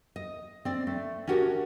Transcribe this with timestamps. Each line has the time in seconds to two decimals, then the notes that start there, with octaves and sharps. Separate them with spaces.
0.16 D#5
0.65 C4 D5
0.87 A3
1.27 C#4 D4 F#4 G4 A#4 C#5